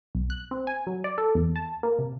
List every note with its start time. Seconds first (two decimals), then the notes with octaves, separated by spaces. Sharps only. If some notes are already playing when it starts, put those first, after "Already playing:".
0.15 B1
0.30 F#6
0.51 C4
0.67 G#5
0.87 F#3
1.04 D5
1.18 A4
1.35 E2
1.56 A5
1.83 A#3
1.99 C3